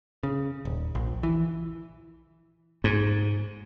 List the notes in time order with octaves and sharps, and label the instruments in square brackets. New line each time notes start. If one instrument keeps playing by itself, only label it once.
[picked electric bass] C#3
D#1
A#1
E3
[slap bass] G#2